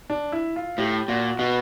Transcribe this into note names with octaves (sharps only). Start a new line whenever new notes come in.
D4
E4
F4
A2 G4
A#2 F#4
B2 F#4